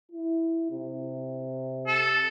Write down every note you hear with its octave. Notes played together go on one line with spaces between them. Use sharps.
E4
C3
A4